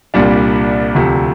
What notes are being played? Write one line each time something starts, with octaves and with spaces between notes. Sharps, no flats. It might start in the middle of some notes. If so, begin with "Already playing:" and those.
C2 A#2 G3 D4
D2 C3 F3